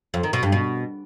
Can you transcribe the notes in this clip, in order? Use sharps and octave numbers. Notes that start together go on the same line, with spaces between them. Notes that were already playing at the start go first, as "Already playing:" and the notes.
F2
D#3
B2
G2
B2